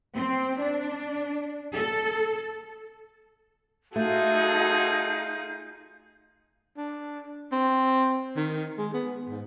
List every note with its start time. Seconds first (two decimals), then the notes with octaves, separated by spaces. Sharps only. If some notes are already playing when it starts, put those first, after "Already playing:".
0.14 C4
0.61 D4
1.74 A4
3.96 A3 D#4 F4 F#4 G#4 A4 F5 G6
6.77 D4
7.52 C4
8.36 D#3
8.78 G#3
8.94 B3
9.29 G#2